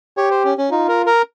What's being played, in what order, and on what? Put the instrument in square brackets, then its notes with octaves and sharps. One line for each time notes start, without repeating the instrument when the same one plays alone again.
[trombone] G4 [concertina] C#5
[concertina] C5
C#4
C#4
[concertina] D#4 [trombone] F4
[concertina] A#4
A#4